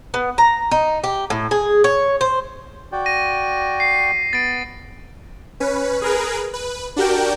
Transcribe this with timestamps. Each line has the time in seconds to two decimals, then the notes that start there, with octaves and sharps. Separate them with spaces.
0.14 B3
0.38 A#5
0.71 D#4
1.04 G4
1.30 A2
1.51 G#4
1.84 C#5
2.21 C5
2.92 F#4 D5 G5
3.06 A#6 D#7
3.80 C7
4.33 B3 A6 D7
5.60 C#4 B4
6.02 G#4 A#4 B4
6.53 B4
6.96 D4 F#4 G4 A#4 G5